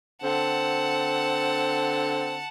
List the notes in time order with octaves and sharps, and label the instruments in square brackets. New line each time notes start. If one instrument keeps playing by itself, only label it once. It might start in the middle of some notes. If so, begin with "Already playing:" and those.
[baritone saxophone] D3 [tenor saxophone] C4 [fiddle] F#5 A5